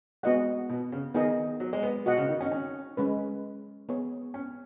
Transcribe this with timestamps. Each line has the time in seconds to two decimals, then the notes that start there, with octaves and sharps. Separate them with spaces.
0.23 G#3 B3 F#4 D#5 F#5
0.69 B2
0.92 C#3
1.14 D#3 B3 G#4 D#5
1.60 F#3
1.73 G#3
1.83 B3
2.06 B2 F#4 D#5 F#5
2.17 C#3
2.29 D#3
2.41 C#4
2.46 D#4
2.52 C#4
2.97 G#3 C#4 B4
3.89 B3 G#4 C#5
4.34 C#4